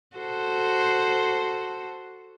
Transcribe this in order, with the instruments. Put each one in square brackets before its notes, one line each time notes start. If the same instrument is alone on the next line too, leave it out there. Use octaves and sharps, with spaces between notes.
[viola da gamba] F#4 A4 C5